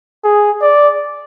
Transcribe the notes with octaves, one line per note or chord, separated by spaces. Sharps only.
G#4
D5